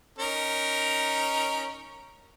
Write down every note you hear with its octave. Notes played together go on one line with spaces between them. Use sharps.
C#4 D#4 A#4